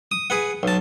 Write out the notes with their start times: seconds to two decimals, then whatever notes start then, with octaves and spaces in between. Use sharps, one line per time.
0.12 D#6
0.30 G#4 B4 F#5
0.63 B1 A5